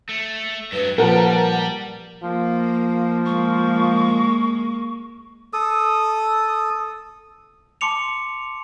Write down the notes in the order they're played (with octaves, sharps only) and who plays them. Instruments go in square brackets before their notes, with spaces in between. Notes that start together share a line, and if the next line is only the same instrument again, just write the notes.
[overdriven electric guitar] A3
[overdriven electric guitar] G2 F#3 [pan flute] B4
[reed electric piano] A#2 F3 [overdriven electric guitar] G3 [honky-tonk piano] A#4 F#5 A5
[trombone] F3 [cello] A#3
[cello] G#3 A#3 [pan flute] C#6
[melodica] A4 D#6
[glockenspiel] A5 C6 D6 C#7 F7